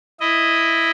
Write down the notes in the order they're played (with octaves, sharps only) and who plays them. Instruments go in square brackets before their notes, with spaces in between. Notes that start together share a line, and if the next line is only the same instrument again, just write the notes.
[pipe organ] E4 D#5